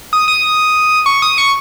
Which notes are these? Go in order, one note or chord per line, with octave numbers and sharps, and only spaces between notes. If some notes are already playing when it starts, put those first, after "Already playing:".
D#6
D#6
C#6
D#6
C#6